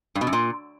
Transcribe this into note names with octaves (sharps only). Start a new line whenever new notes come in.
G2
B2
F#2
A#2